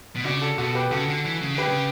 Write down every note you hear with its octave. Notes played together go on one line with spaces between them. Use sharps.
B2
C#3 D4 F#4
F#4 A4
B2 F#4 A4
G4 B4
C#3 F#4 A4
D3
E3
C#3
D3 G4 B4
C#3